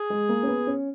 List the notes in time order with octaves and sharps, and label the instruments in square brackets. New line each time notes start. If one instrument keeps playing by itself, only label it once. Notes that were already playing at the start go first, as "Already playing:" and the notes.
Already playing: [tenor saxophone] G#4
[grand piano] G#3
A#3
C#4
B3
C#4